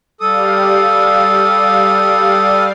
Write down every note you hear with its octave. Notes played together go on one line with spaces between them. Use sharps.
G3 A4 F5 D#6